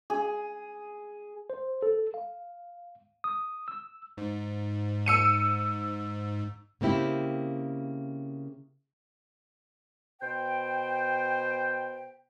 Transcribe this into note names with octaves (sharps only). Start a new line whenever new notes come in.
G#4
C5
A4
F5
D#6
E6
G#2
E6 C#7 D#7
C#3 A#3 C4 E4 G4
B2 C5 G5